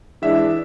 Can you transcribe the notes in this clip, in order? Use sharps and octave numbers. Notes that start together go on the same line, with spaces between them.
E3 G#3 D4 E5